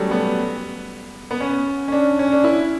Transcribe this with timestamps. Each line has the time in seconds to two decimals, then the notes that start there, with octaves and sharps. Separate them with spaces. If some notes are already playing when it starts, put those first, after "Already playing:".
Already playing: F#3 G3 A3 C#4
0.11 B3
1.31 B3
1.40 C#4
1.88 C#4
1.92 D4
2.19 C#4
2.32 D4
2.44 E4